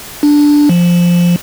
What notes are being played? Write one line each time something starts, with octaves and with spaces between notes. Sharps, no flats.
D4
F3